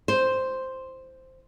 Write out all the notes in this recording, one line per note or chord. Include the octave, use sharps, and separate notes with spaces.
C5